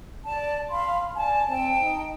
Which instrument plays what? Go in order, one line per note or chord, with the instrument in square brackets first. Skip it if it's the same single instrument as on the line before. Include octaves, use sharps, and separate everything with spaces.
[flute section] D5 A5
F5 B5 C6
[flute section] D5 A5 [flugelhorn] G#5
[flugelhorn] C4 [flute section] G5 A5
[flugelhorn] D#4